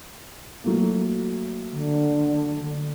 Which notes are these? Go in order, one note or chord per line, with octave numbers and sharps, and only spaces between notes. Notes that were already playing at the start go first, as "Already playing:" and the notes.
F#3 A3 A#3
D3